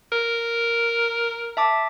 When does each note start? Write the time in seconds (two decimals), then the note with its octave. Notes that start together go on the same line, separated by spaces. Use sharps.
0.12 A#4
1.57 E5 A5 D6